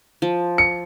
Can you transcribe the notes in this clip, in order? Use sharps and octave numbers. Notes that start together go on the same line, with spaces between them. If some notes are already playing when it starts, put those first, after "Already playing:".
F3
C#7